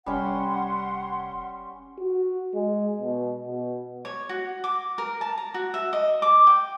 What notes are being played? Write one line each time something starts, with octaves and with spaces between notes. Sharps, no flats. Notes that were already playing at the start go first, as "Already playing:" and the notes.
F1 G3 C#4 F#5 C6
F#4
G#3
B2
B2
C#5
F#4
D6
A#4
A5
A#5
F#4
E5
D#5
D6
G5